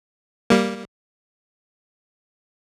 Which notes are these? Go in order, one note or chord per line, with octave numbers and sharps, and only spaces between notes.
G3 A#3